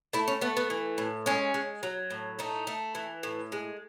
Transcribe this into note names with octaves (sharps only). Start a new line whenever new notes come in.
A3 E4
C#4
A3 B3
B3
E3
A2
G#3 C#4
G#3
F#3
A2
A3 D#4
A3
E3
A2
G#3